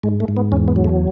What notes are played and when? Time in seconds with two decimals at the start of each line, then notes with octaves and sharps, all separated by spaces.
0.03 G#2 G#3
0.20 A3
0.28 G#2
0.37 B3
0.52 E2 C#4
0.68 B3
0.76 F#3
0.84 A3